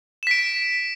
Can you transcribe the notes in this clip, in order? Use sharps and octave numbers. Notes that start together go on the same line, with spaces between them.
B6 D7 E7